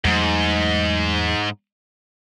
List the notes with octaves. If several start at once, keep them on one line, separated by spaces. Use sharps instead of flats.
E2 G#2 F#3 A3